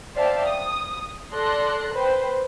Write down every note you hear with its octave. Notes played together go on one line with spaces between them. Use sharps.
C5 D5 E5 F5 G5 A5
D#6
A4 D5 C6 F#6 A#6
B4 C5 G5